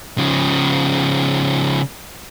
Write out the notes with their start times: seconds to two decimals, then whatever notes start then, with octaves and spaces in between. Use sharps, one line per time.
0.18 C#3 F3